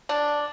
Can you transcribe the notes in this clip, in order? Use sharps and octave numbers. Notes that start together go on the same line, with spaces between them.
D4